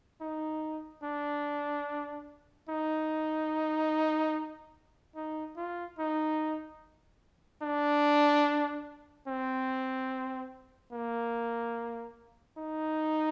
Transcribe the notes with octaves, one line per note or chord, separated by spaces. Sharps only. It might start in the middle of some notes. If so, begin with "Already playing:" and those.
D#4
D4
D#4
D#4
F4
D#4
D4
C4
A#3
D#4